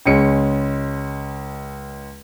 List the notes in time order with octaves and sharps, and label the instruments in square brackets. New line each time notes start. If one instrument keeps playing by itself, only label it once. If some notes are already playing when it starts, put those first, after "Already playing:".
[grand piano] C#2 G#3 C#4 C#7